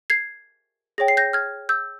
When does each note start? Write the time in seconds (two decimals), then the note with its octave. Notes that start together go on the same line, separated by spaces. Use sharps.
0.10 G#6 C7
0.98 G#4 C#5 G5 A#6
1.08 C7
1.17 G6 A#6
1.33 F6 G#6
1.69 E6 G6